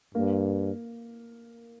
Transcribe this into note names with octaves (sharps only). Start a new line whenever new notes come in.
G2 A#3